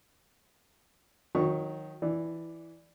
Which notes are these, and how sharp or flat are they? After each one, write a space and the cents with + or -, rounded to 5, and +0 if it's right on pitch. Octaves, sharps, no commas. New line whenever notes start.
D#3 +0 F#3 -30 C#6 +0
E3 +0 D5 +0